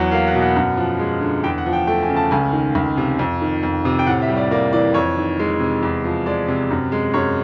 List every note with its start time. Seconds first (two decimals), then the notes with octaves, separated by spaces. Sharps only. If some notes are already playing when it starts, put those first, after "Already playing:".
Already playing: E2 F#3 F#5
0.11 A#3 F5
0.27 F#5
0.34 B2
0.42 F#5
0.56 F#2
0.77 F3
0.99 G#3
1.21 D3
1.44 E2 G5
1.58 F#5
1.66 F3
1.73 G5
1.87 A3 G5
2.03 G#5
2.09 C#3
2.16 A5
2.31 C#2 G#5
2.53 D#3
2.75 C#2
2.97 C3
3.19 F2
3.42 D#3
3.63 F2
3.85 C3
3.99 G5
4.07 A2 F#5
4.22 E5
4.28 G3
4.37 D5
4.51 A#3 D5
4.73 E3 D5
4.94 F2 C#5
5.17 D#3
5.39 G#3
5.60 C3
5.83 E2
6.05 F3
6.26 G#3 D5
6.48 C3
6.71 F#2
6.92 G#3
7.14 F#2 C#5